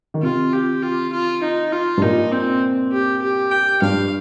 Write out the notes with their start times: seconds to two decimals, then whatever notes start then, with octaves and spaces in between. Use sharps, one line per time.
0.14 D#3
0.22 C3 F4
0.53 G4
0.82 F4
1.12 F4
1.43 D#4
1.72 F4
1.97 G2
2.02 A#2 D#4
2.32 C4
2.92 G4
3.22 G4
3.51 G5
3.82 G2 F5